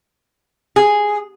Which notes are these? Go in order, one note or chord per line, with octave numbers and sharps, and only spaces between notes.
G#4